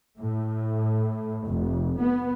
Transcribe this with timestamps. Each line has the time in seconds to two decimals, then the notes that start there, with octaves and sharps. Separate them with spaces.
0.18 A2
1.45 F1
1.98 B3